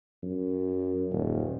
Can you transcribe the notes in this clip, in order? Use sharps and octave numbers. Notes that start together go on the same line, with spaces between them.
F#2
D#1